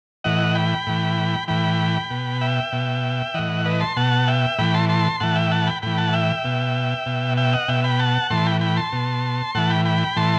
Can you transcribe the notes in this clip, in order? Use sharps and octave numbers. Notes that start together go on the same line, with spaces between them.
A2 E3 D#5 F#5
G5 B5
A2 E3
A2 E3 G5 B5
B2
E5 G5
B2
A2 E3 D#5 F#5
B4 D#5
A5 C6
B2 F#5 A5
E5 G5
A2 E3 G5 B5
A5 C6
A5 C6
A2 E3 F#5 A5
E5 G5
F#5 A5
G5 B5
A2 E3 G5 B5
F#5 A5
E5 G5
B2
B2
E5 G5
D#5 F#5
B2 E5 G5
G5 B5
F#5 A5
A2 E3 A5 C6
G5 B5
G5 B5
A5 C6
B2
A2 E3 F#5 A5
G5 B5
G5 B5
A2 E3 A5 C6